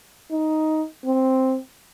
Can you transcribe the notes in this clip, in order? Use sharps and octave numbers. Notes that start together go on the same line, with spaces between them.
D#4
C4